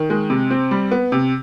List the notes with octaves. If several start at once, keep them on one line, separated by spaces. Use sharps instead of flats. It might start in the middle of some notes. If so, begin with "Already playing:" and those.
Already playing: D#3
G#3
C3
C4
G3
B3
C3